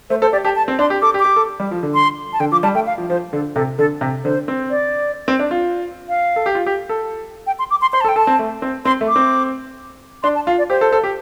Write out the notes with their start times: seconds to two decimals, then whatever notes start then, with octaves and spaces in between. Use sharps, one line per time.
0.10 A3 C5
0.22 A4 C5
0.32 G4 D5
0.44 G4 A5
0.55 A5
0.68 C4
0.79 D4 C6
0.90 G4
1.02 A4 D6
1.14 G4
1.19 D6
1.25 G4
1.36 A4
1.60 G3
1.71 F3
1.83 D3
1.94 C6
2.33 A5
2.40 D3 G5
2.52 F3 D6
2.63 G3 A5
2.75 A3 G5
2.87 F5
2.98 F3
3.10 F3 C5
3.33 D3 A4
3.55 C3 A4
3.78 D3 A4
4.01 C3
4.24 D3 C5
4.48 C4
4.70 D5
5.28 C4
5.39 D4
5.51 F4
6.09 F5
6.36 A4
6.46 G4
6.55 F4
6.66 G4
6.89 A4
7.47 G5
7.59 C6
7.71 D6
7.82 C6
7.93 C5 C6
8.01 A5
8.05 A4
8.09 G5
8.16 A4 A5
8.27 C4
8.39 A3
8.62 C4
8.85 C4 C6
9.01 A3
9.08 D6
9.16 C4
10.23 D4 C6
10.35 A5
10.47 F4 F5
10.58 D5
10.70 G4 C5
10.81 A4
10.93 A4
11.04 G4